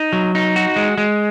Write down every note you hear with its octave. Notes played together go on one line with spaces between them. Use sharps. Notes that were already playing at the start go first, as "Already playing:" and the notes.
Already playing: D#4
F#3
D#4
F#4
G#3
G#3